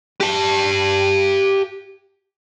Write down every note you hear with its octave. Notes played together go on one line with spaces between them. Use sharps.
G4 A5